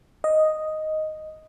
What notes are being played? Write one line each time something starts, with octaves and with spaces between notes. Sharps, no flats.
D#5